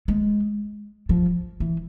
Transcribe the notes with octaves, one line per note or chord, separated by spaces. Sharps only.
G#3
F3
E3